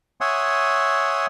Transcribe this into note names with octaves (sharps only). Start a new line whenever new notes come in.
C#5 E5 F#5 G#5 C6 D#6